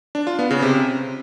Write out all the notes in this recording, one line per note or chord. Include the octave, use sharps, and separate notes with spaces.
D4
F4
B3
C#3
C3